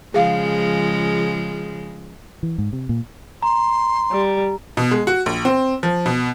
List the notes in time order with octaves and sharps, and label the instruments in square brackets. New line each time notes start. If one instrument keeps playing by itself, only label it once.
[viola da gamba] C#3 F3 G#3 [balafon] G#4 F5
[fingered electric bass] E3
G#2
C3
A#2
[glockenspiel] A#5 [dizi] C6
[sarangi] G3
[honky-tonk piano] B2
G#3
F#4
A#1
C4
F3
B2